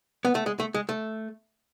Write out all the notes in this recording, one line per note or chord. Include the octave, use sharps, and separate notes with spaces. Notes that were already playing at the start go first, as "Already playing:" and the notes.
B3
A3
G#3
A3
G#3
A3